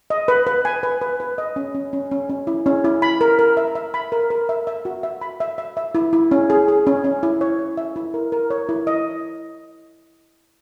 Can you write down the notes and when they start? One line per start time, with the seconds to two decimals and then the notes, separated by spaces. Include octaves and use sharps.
0.10 D#5
0.28 B4
0.47 B4
0.65 G#5
0.83 B4
1.01 B4
1.20 B4
1.38 D#5
1.56 C#4
1.75 C#4
1.93 C#4
2.11 C#4
2.29 C#4
2.47 E4
2.66 C#4
2.85 E4
3.02 B5
3.21 A#4
3.39 A#4
3.57 E5
3.75 E5
3.94 B5
4.12 A#4
4.31 A#4
4.49 E5
4.67 E5
4.85 F#4
5.03 E5
5.21 B5
5.40 E5
5.58 E5
5.77 E5
5.95 E4
6.13 E4
6.31 C#4
6.50 G#4
6.68 G#4
6.87 C#4
7.04 C#4
7.23 E4
7.41 C#5
7.59 C#5
7.78 E5
7.96 E4
8.14 A#4
8.32 A#4
8.50 C#5
8.69 E4
8.87 D#5